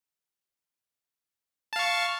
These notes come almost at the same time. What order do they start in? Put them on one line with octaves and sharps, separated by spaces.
A5 F5 C#6